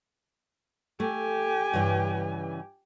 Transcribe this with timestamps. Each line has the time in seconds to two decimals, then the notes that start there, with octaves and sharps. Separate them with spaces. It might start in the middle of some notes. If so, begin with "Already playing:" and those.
1.00 A3 G4 G#5
1.74 G2 C#3 E3